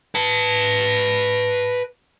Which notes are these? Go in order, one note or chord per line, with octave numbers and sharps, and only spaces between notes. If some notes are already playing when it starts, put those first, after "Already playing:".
B4 A5